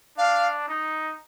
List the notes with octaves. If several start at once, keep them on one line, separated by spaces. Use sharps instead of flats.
D4 F5
D#4